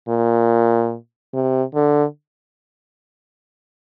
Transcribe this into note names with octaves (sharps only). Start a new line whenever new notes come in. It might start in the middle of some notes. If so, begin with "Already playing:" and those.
A#2
C3
D3